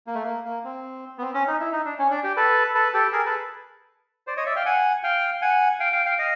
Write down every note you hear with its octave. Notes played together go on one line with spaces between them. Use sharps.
A#3
A3
A#3
A#3
C4
B3
C4
C#4
D#4
E4
D#4
D4
C#4
D4
G4
A4 B4
A4 B4
G4 A4
G#4 A#4
A4 B4
C5 D5
C#5 D#5
D5 E5
F5 G5
F#5 G#5
F5 G5
F#5 G#5
F5 G5
F5 G5
F5 G5
D#5 F5